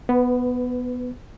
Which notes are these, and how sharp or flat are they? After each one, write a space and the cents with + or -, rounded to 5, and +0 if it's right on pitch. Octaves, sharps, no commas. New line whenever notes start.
B3 +0 B4 +25